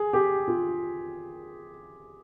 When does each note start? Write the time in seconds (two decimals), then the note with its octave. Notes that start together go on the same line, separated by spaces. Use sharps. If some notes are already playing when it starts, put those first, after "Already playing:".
Already playing: G#4
0.13 G4
0.48 F4